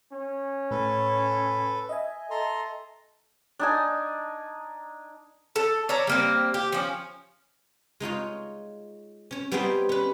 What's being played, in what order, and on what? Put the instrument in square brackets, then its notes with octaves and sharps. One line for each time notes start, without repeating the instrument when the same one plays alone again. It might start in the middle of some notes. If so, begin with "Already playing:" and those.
[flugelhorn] C#4
[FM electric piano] A2 [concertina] A4 B4
[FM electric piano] D#5 E5 G#5
[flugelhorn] A4 [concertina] A#5 C6
[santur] D4 D#4 G#5
[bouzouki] A4
C#5 D5 E5 A#5
G3 A#3 C4
G4
F3 C#4
[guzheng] G#3 D#4 F4 C#5
C#4 C#5
G3 B3 D#4 G#4 C5 G5
C#4 B4